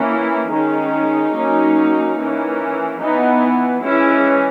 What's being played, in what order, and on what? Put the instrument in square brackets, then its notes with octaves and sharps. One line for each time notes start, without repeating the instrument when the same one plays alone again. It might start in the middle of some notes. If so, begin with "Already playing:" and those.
Already playing: [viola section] E3 A#3 C#4
E4
D#3 G#3 C#4 D#4
F#3 A#3 C#4
E3 A#3 C#4
E3 B3 D#4
E3 G#3 C#4 E4